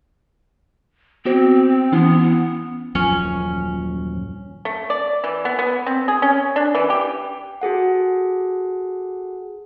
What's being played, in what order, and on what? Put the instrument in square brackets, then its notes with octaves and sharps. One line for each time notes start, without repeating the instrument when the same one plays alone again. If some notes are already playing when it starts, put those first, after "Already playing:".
[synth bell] B3 F#4 C5 [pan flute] C4
[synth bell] E3 C#4 E4 [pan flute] B3
[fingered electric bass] D#1 F#2 F3 [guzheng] C#4
[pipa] A3
D5
E3
B3
B3
C4
G#4
C#4
D4
E3
G4
[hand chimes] F#4 G#4 A4 F#5